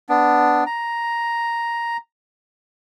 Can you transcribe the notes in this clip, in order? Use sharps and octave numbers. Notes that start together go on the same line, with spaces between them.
B3 D4
A#5